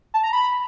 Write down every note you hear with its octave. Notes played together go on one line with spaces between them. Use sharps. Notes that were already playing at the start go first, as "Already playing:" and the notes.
A5
A#5
B5